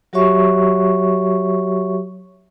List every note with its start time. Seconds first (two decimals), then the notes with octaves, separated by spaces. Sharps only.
0.13 F#3 F#4 G4 C#5 E5 C#6